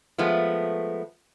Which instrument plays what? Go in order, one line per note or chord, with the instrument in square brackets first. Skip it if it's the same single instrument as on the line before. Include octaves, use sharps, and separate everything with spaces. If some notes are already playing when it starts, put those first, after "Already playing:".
[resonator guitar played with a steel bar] F3 G#3 A3 B3